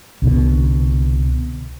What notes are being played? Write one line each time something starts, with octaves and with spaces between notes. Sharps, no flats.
C2 B2 D3